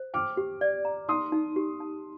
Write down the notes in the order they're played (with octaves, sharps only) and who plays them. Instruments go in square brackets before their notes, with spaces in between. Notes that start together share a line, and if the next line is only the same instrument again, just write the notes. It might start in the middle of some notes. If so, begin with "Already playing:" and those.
Already playing: [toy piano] C5
[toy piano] G5 [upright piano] D6 F6
[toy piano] G4
D5
A#5
[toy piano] D#4 [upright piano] C6 D#6
[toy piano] D#4
G4
A5